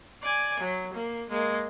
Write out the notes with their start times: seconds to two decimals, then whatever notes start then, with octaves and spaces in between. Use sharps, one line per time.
0.22 D5 G#5
0.60 F#3
0.94 A#3
1.30 G#3 A#3